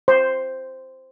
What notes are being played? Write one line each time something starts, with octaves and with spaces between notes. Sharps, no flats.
C5